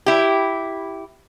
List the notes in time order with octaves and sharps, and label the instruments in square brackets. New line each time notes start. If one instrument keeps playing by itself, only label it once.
[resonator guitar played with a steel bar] E4 G4